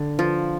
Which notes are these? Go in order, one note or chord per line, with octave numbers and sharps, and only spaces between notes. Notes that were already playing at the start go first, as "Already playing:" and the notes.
Already playing: D3
F3